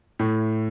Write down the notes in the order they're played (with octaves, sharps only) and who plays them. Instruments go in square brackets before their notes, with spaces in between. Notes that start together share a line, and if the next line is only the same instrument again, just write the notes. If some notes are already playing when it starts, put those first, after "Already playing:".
[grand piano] A2